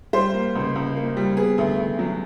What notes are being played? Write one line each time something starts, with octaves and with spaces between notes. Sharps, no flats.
G3 C5
A#3
C#2
C#2
A#3
G3
B3 G#4
D2
D2
F#3